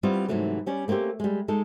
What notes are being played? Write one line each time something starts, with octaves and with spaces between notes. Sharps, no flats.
G3 B3 C4 E4 F4 G4
G#2 C3 E3 F#3 A3
G3 C#4 D5
A3 A#3 C4 C#4 G4
G3 G#3
G#3 D#4 A4